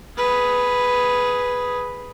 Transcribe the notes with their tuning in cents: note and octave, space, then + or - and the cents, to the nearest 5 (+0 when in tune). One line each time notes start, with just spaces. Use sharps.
G#4 +0 B4 +0